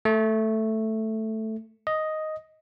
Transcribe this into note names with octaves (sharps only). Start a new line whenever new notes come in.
A3
D#5